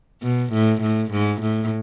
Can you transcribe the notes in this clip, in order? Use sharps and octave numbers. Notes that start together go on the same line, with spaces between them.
B2
A2
A2
G#2
A2